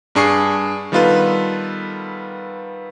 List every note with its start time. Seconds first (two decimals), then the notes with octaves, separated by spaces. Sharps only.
0.15 G2 D4 G#4 C#6 C7
0.92 D#3 G3 B3 F4 A4 B4